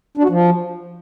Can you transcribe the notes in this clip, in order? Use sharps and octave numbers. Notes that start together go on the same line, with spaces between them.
D4
F#4
F3